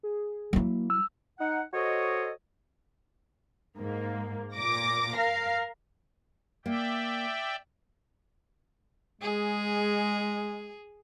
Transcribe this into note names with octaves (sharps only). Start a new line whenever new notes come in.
G#4
F#3 A#3 E4
E6 F6
D#4 F#5
F#4 A4 C5 C#5 D#5
G#2 A#3
A#2 D6 A#6
A#4 F5
A#3 D5 E5 G5
G#3 G#4